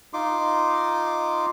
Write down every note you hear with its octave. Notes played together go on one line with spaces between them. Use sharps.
D#4 F4 C6 D6